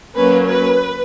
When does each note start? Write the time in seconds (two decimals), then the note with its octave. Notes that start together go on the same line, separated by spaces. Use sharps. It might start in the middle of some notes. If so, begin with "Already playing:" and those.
0.15 F#3 A#3 C#4 B4
0.46 B4